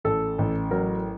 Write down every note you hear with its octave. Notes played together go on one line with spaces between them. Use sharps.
A1 A4
A1
F#3 A#4